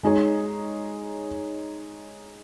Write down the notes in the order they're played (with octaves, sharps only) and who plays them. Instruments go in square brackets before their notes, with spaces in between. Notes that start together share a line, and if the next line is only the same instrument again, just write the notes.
[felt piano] G#3 D#4 G#4 C#5